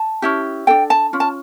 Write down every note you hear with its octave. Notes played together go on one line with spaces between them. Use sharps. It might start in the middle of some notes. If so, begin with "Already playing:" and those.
Already playing: A5
C#4 E4 G4
D4 A4 G5
A5
C#4 F4
A5